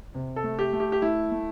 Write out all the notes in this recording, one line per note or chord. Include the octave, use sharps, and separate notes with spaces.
C3
A4
A3
G4
A3
G4
G4
A3 E4
A3